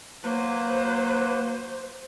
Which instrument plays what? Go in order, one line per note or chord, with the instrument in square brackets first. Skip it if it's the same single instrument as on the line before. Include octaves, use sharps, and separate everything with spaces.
[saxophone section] F#3 B4 [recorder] A#3 [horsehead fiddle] C5